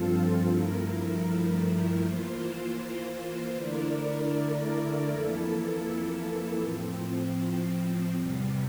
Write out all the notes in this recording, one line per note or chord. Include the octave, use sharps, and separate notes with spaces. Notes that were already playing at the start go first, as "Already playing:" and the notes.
Already playing: G2 F3 C4 F4 A4
G2 F3 A3 E4 A#4
E3 A#3 F4 C5
D3 A3 E4 A#4 D5
F2 E3 A#3 E4 A4
A2 F3 C4
E2 C3 G3